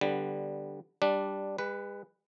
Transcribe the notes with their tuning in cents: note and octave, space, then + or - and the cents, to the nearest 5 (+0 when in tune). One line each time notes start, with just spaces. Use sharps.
D3 +0 G3 +0 B3 +0
G3 +0 D4 +0
G#3 -45 B4 +0